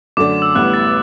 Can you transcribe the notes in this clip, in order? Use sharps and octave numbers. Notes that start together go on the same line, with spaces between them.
F#2 D3 A3 D4 D6
E6
A1 A2 G3 B3 F#6
A6